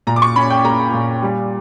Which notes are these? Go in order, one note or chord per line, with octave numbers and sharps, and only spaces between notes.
A#2 A#5
D6
C#6
C#4 B5
G5
A#3 A#5
A#2
G3